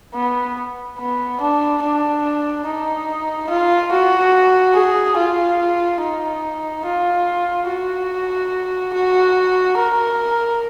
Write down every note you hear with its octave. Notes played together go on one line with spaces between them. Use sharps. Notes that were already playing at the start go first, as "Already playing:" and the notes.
B3
B3
D4
D4
D#4
F4
F#4
G#4
F4
D#4
F4
F#4
F#4
A#4